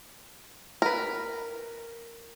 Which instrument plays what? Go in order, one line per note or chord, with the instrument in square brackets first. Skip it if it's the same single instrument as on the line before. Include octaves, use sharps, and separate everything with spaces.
[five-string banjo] A#4 B4